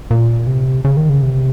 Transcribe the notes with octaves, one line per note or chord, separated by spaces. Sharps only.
A#2
C3
C#3
D#3
C#3
C3